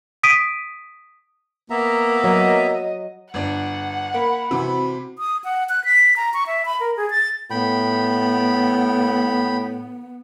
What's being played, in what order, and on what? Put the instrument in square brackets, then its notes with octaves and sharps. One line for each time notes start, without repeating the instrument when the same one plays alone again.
[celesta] D#6 B6 D7 D#7
[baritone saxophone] A#3 [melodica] B3 E5 A#5
[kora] F#3 [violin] D#5
[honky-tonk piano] G1 D4 [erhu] F#5
[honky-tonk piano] A#3 [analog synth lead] B5
[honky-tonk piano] C3 E3 [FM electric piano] C4 F#4
[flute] D#6
F#5
F#6
B6
A#5
C#6
E5
B5
A#4
G#4
A6
[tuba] A2 [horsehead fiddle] B3 [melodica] G5 B5